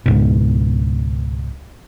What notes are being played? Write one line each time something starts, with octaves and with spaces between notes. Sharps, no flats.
C#2 G#2 B2